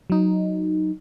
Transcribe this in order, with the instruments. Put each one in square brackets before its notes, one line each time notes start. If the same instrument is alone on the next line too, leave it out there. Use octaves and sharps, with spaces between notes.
[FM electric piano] F#3 D#4